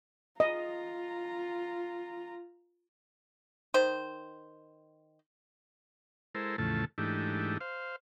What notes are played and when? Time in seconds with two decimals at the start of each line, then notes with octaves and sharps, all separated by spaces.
0.40 F4 D#5 A#5
3.74 D#3 C5
6.35 G#3 E4 A4 A#4 C5
6.58 E2 A2 C#3 F3 A3 A5
6.98 G#2 E3 A3 D4 D#4 G4
7.61 C5 F5